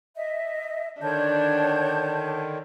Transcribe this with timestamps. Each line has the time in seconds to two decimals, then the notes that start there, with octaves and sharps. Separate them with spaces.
0.15 D#5 E5
1.02 D3 D#3 D4 C#5 A5 G6